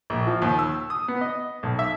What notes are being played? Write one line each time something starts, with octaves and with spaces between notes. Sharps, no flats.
A#1
F3
D#2
E6
D#6
B3
D#5
B1
E5